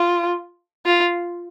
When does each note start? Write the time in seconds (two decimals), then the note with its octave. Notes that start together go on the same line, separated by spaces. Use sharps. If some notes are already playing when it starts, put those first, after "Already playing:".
Already playing: F4
0.86 F4